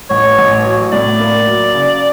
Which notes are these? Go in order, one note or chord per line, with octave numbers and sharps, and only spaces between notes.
A1 C#5
A1
F#3
A2 D5
A#3
F#3
C#3